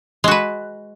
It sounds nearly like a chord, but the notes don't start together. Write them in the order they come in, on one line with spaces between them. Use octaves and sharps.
G#3 F#4 B4